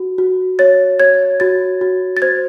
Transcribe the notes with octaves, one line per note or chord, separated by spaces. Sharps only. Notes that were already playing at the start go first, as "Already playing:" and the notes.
Already playing: F#4
F#4
C#5 A6
C#5 G#6
F#4 A6
F#4
A6
C5 G#6